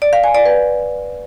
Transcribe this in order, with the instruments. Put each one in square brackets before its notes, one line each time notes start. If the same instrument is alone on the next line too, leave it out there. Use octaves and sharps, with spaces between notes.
[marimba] D5
F5
G#5
D5
B4